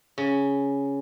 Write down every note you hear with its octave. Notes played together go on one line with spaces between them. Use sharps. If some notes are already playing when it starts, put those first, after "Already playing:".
C#3